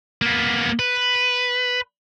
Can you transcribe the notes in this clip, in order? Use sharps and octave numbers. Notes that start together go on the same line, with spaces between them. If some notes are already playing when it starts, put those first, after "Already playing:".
A#3 B3
B4